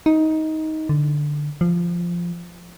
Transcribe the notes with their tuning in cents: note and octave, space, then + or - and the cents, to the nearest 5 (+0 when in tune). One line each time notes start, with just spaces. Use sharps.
D#4 +15
D3 +5
F3 -10